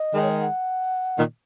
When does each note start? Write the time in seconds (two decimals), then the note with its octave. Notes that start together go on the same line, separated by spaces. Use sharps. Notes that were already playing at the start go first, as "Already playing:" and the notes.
Already playing: D#5
0.14 D#3 G#3
0.22 C#5
0.32 D#5
0.40 F#5
1.17 A#2 D#3